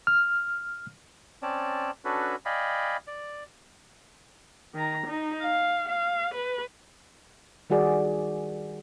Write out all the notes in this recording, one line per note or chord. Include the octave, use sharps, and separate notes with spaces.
F6
C4 C#4 D5 A5
C#4 D4 F#4 A4 B4
D5 D#5 F5 G5 G#5 B5
D5
D#3 A#5
D#4
F5
F5
B4
D#3 G3 F#4 G#4 D5